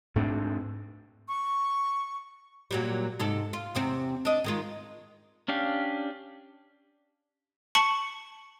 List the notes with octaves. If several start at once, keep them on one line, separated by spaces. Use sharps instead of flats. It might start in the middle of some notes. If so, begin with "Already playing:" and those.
G#2 A3 C4 D4
C#6
A#2 F#3 G3
G#2 C3 A4
F4
E2 C3 C4
D4 D#5
D#3 G#3 F4
C#4 D4 G4 F5
A5 C#6 C#7 F#7